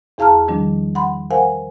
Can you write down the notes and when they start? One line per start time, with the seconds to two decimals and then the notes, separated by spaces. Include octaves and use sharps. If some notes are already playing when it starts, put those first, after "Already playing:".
0.18 E2 G#4 F5 A5 A#5 F6
0.48 D#3 F3 G3 D4
0.95 F#5 B5 C6
1.31 A#4 C5 F5 F#5 G#5